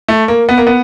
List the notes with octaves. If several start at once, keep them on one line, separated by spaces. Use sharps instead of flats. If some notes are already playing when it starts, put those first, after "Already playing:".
A3
A#3
B3
A#3
B3